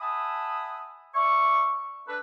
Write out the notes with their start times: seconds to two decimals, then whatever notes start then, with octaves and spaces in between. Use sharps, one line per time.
0.01 E5 F#5 G#5 A5 B5 D#6
1.15 D5 E5 C#6
2.08 D4 A4 B4